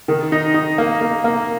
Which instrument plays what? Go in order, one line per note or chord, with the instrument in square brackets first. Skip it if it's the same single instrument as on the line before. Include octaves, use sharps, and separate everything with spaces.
[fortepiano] D#3
D#4
D#4
A#3
A#3
A#3